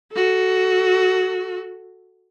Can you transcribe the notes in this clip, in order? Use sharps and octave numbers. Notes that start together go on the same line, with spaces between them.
F#4 A4